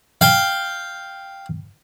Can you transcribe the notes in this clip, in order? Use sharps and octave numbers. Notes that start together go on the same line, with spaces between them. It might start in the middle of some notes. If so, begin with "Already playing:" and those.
F5 G5